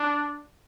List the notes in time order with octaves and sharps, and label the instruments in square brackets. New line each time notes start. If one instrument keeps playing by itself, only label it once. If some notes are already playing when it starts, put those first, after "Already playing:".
Already playing: [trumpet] D4